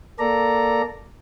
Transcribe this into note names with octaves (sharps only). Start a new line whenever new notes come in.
A#3 A4 D5 A#5